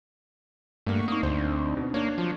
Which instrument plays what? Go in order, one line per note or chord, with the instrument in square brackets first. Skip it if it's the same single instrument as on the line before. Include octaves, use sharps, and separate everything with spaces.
[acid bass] G2 [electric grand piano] A3 A#3 [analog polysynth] F#5 C#6
[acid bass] A#3 [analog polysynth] C4 D4 D#4 [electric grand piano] C#6 D#6
[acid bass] D2 [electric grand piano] C5
[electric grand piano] B2
[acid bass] A#3 [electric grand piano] D4 C#5
[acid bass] F3 [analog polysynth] F#3